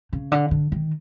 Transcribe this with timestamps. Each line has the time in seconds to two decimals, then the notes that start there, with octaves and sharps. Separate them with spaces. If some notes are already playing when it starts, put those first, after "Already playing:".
0.13 C#3
0.32 D3
0.51 D3
0.72 D#3